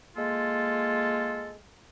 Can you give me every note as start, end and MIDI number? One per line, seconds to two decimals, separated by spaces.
0.16 1.54 56
0.16 1.54 58
0.16 1.54 65
0.16 1.54 69